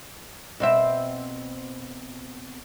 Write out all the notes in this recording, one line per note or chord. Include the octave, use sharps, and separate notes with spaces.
B2 C4 E5